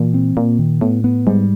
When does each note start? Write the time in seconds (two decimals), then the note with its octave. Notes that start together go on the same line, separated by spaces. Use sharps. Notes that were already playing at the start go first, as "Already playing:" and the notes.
Already playing: A#2 E3
0.14 C4
0.37 A#2 A#3
0.59 D#3
0.81 A2 B3
1.04 B3
1.27 G#2 G3